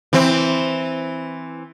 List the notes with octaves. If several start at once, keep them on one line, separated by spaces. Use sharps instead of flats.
E3 C4